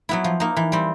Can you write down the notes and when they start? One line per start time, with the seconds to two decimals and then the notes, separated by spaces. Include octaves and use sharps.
0.09 F#3 B3 E4
0.24 F3
0.40 A#3 D#4
0.56 E3
0.72 G3 C4